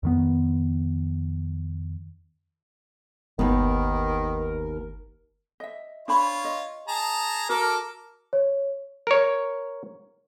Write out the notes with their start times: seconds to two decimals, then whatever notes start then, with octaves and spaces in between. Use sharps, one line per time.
0.03 F2 D#3 B3
3.39 G1 D#2 D#3 B3 A#4
5.60 D#5 E5
6.08 D4 F4 C5 C#5 B5
6.45 D#5
6.88 G#4 A5 A#5
7.50 F#4 A4 A#4 D6
8.33 C#5
9.07 A#4 C#5